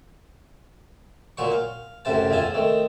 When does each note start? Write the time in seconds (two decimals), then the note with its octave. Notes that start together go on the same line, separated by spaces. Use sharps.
1.37 A#2 F#3 C5 C#6
1.52 F5
2.05 F#2 A2 C3 C5 A5
2.30 B1 E2 F3 C4 G#5 A5
2.54 D#3 A3 C4